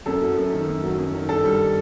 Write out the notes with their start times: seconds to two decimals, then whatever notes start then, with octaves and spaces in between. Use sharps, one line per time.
0.06 F#2 A4
0.22 F#3
0.37 F#2
0.52 D#3
0.68 F#2
0.83 F#3
0.98 F#2
1.14 D#3
1.28 G2 A4
1.44 G3